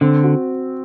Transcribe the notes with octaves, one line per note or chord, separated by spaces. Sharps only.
D3 C4
F#4